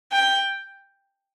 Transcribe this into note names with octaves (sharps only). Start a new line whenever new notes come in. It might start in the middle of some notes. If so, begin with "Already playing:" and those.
G5